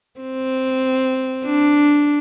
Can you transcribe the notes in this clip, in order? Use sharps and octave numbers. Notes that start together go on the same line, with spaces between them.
C4
D4